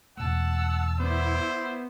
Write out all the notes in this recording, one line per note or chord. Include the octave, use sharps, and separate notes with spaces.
E2 B2 A3 F#5 A5 E6
B3 E4 C5 D5